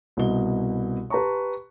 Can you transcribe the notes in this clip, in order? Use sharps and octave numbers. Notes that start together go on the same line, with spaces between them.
C2 B2 D#5 G7
G4 B4 A5 A#5 C6 C#6